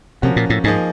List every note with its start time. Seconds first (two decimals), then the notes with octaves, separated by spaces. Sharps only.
0.22 C3 F3 A#3 C#4 F#4
0.36 A#2
0.50 A2
0.64 G#2 F3 A#3 D#4 G#4